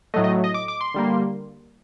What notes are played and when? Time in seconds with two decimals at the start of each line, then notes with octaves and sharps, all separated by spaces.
0.14 A2 F#3 A3 D#5
0.24 D#5
0.44 D#5
0.54 D6
0.68 D6
0.81 C6
0.94 D3 G3 A#3